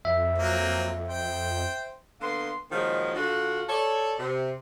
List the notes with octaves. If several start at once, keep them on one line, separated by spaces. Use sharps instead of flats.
F2 E5
F#3 A#3 C4
C5 G5
D3 A#3 B3 C6
A#2 D#3 F3 F#3 G#3
D3 F4 F#4
A4 C#5 D5
C3